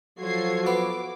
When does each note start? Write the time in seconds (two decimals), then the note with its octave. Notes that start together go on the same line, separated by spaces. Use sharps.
0.19 F3 F#3 F4 F#4 A4 G#6 C7
0.66 B3 D6